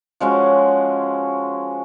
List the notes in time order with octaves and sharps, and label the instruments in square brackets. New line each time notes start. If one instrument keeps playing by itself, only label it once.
[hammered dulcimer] F3 G#3 C#4 F#4